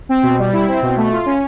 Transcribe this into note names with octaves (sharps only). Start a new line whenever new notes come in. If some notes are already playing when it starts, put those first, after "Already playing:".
C4
B2
G3
E4
C4
B2
A3
F4
C#4